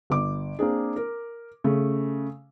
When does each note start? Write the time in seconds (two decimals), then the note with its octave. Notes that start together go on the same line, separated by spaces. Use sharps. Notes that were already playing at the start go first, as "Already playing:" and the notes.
0.10 G1 D6
0.59 A#3 C4 D4 G#4
0.96 A#4
1.64 C#3 A3